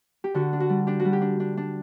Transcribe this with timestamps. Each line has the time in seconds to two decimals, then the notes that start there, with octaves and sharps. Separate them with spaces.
0.24 G4
0.34 D3 F#4
0.53 D4
0.60 F#4
0.70 G3
0.87 D4 G4
1.00 F#4
1.05 G3
1.13 G4
1.21 D4
1.40 D4
1.57 D4